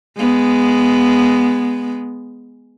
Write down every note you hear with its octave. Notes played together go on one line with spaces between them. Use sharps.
G#3 B3